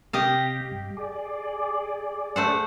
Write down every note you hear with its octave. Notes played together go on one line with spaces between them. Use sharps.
C3 G4 D#5 F5
G2
G#4 D5
A3 C5 F#5